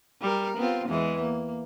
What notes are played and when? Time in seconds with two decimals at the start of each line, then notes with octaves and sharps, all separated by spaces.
0.21 G3 A#4
0.57 B3 C4 F4
0.88 E2 E3 G#3
1.21 A#3